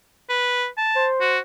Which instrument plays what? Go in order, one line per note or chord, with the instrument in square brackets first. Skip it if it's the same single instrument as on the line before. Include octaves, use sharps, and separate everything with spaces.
[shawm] B4
A5
[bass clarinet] C5
[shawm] F#4